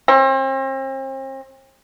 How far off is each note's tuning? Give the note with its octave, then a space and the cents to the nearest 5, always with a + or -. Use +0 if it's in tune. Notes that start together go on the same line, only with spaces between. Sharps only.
C4 +40